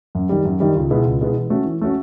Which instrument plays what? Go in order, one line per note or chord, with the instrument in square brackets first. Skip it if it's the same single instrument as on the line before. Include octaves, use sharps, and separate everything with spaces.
[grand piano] F#2
D#3 G3
F#2
D#3 G3
C#2
B2 G#3 B3 E4
C#2
B2 G#3 B3 E4
E3
A3 C#4 F#4
E3
A3 C#4 F#4